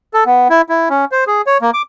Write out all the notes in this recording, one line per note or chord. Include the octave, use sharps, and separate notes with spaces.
A4
B3
E4
E4
C#4
C5
G#4
C#5
A#3
D6